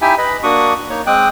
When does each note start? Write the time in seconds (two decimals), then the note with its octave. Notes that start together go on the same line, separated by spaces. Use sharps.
0.02 D#4 E4 G4 E5 G5 G#5
0.18 B4 D#5 B5
0.43 A#3 D4 F#4 C#6 D#6
0.90 A#3 D#4 C#5
1.07 G#3 C4 G5 D6 D#6 F#6